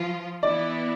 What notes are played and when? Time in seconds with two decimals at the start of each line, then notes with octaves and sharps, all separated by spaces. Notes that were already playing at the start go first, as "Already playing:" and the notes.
Already playing: F3 F4
0.43 E3 B3 E4 D5